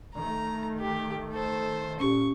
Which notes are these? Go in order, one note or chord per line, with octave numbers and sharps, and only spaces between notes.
D#3 A3 A#5
G4
A4 C5
A#2 C#4 G4 C#6